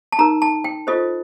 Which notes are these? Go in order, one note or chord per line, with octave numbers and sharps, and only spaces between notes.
A5
D#4 A#4 A#5
A5
G5
F4 A4 C5 D#5